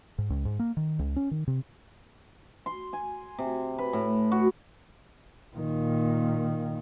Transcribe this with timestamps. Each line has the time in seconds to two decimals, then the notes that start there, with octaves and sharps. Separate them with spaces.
0.18 G#2
0.30 C#2
0.45 G#2
0.59 A#3
0.77 D#3
0.99 C#2
1.16 C#4
1.31 D#3
1.47 C3
2.66 C6
2.93 G#5
3.38 C3
3.78 B4
3.93 A2
4.32 F#4
5.56 A#2 D#3